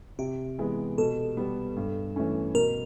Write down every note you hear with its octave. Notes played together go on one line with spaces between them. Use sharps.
C3 G4
E3 G#3 B3
B2 A4
G3 B3
G2
E3 A3 C#4
B2 A#4